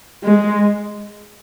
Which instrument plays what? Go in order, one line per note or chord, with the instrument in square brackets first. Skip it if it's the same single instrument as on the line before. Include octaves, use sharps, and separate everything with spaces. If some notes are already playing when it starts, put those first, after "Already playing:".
[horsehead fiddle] G#3